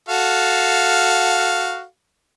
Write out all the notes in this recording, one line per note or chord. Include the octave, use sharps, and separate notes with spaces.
F#4 A4 F5